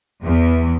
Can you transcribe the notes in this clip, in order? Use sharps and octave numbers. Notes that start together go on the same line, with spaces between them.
E2